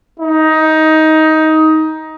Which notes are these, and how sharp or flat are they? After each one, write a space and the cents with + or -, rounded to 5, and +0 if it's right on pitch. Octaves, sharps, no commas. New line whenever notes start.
D#4 +15